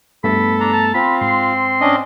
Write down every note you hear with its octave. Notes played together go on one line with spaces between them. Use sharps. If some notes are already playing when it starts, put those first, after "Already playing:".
G2 A3 B3 A4 B5
D4 A#5
A5
C4 F4 B5
G#2 C6
C#4 D4 D#5